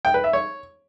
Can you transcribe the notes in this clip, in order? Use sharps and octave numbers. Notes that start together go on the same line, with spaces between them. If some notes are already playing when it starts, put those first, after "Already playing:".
G5
B4
E5
C#5